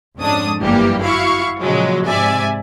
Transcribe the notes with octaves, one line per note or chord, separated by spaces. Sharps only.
F2 G#2 C#4 D4 D#6
G1 F#2 E3 G3 A#3 G4
E4 F#4 F5 C#6
A#2 C#3 F3 F#3 G#3
G#2 C3 D5 E5 G#5